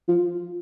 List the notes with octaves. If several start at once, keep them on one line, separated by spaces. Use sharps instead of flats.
F3